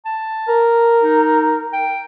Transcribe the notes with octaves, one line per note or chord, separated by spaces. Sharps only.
A5
A#4
D#4
G5